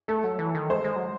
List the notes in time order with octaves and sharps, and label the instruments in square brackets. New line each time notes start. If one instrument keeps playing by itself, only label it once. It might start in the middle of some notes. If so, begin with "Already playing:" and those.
[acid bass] A3 [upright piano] A4
[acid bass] F#3
E3
D#3
[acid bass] G#3 [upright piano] C5
[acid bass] G#3
F#3